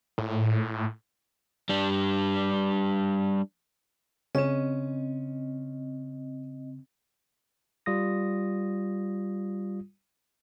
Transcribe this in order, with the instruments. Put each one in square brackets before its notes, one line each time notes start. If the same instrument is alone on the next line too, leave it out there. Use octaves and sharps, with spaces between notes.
[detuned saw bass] A2
[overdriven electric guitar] G3 D4
[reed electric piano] C#3 [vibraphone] C4 D#5 [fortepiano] C#4
[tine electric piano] G3 F4 D#6 A#6